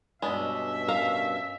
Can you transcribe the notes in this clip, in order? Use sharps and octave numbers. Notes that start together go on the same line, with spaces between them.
G2 B2 G#3 B3 C#4 D4 E5
A#4 F5